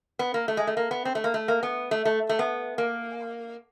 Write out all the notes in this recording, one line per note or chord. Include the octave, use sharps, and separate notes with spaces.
B3
A#3
A3
G#3
A3
A#3
B3
C4
A3
A#3
A3
A#3
B3
A3
A3
A3
B3
A#3